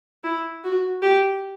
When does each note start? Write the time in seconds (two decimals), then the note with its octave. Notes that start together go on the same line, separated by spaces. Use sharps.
0.24 E4
0.64 F#4
1.02 G4